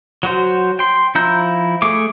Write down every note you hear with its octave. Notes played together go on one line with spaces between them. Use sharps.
F#3 F#4 C5
G5 C6
F3 E4 A#5 G6
A3 G#4 D6